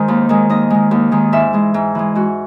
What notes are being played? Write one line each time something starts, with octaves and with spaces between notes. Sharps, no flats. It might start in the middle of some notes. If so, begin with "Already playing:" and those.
Already playing: D#3 G#3 C5
D#2
D#3 G#3
D#2 D#5
D#3 G#3
D#2
D#3 G#3
G#2 E5
E3 G#3
G#2
E3 G#3
G#2 F#4